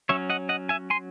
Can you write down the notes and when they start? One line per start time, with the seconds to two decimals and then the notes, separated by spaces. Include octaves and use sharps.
0.09 F#3 C#4 C#5 E5
0.30 D#5 F#5
0.49 D#5 F#5
0.69 E5 G#5
0.90 G#5 C6